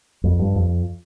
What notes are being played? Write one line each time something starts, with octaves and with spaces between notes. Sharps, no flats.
F2
G2
F2